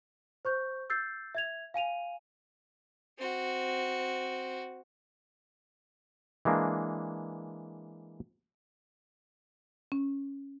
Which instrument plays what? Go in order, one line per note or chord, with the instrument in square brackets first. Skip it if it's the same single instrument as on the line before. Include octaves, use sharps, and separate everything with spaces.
[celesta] C5 C#6 G6
E6 G6 A6 C7
E5 G#6 F7
F5 G#5 D#7 F7
[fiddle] C4 F#4
[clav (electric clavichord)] E3 G#3 A#3 D4
[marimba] C#4